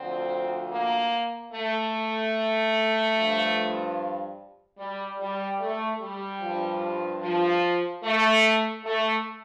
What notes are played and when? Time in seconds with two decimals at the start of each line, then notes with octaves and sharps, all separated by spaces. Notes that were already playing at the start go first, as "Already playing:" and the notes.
Already playing: D2 D3 F3 C4
0.71 A#3
1.53 A3
3.15 G2 F3
4.78 G3
5.19 G3
5.59 A3
5.99 G3
6.40 G2 F3
7.22 F3
8.03 A3
8.84 A3